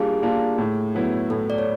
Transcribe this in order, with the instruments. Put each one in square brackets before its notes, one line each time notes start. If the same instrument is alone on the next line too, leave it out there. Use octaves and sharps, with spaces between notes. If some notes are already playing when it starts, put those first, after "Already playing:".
Already playing: [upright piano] G3 A#3 D4 F4 [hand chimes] G#4
[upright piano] A#3 D4 F4
A2
F#3 B3 E4
[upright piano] A2 [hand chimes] A4
[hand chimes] D5
C#5